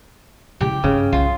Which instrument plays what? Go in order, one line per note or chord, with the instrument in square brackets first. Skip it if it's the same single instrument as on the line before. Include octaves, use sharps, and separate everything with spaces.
[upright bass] C#3 E4 [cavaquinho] G4
[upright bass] G2 [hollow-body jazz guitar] C#3
[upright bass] C2 [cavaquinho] F4